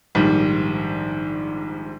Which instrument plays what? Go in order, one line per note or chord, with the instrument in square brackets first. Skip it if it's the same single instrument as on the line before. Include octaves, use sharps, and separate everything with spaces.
[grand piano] A#1 G#2 D#3 G3